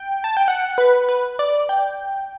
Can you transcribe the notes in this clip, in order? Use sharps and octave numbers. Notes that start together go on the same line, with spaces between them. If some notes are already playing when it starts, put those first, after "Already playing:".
Already playing: G5
A5
G5
F#5
B4
B4
D5
G5